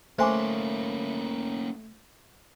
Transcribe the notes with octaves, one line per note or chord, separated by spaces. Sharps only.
A3 A#3 C#4 C5 G#5 C6 D6